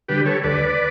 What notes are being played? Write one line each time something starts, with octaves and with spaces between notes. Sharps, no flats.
D3 G3 G4 B4
A4 C#5
D2 B4 D5